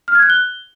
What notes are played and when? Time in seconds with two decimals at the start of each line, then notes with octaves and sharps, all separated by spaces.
0.08 F6
0.15 G#6
0.22 F#6
0.30 G7